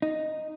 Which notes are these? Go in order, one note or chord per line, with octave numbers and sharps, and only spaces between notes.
D#4